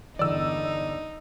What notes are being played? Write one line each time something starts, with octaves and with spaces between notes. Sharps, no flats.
G1 E2 D#4 D5 E6